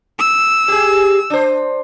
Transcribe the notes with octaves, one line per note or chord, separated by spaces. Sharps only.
E6
G4 G#4
D4 C5